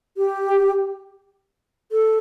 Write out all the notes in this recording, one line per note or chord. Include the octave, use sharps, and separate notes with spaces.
G4
A4